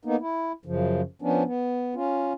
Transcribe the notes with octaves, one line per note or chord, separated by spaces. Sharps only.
A#3 B3 D#4
E4
F#2 C#3 F3
F3 B3 C#4 D4
B3
C#4 F4